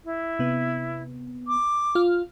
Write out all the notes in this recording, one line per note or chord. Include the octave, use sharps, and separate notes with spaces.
E4
C3 B3
D6
F4 F6